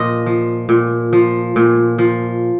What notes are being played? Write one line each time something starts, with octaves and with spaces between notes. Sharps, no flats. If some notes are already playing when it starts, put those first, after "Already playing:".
Already playing: A#2 F3 C5 D#5
F3
A#2
F3
A#2
F3